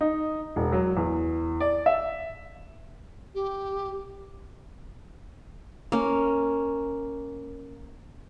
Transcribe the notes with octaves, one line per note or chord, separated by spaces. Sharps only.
D#4
E1
F#3
E2
D5
E5
G4
A#3 C#4